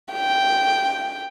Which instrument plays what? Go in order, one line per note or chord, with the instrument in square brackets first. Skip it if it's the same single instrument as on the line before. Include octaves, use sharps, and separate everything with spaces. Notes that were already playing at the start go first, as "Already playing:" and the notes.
[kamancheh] G5